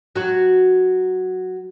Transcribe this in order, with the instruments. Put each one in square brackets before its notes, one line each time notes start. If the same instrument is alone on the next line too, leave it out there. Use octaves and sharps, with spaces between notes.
[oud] F#3 F#4